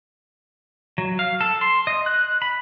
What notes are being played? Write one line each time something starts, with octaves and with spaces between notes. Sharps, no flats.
F#3
F5
A4
C6
D#5
F#6
B5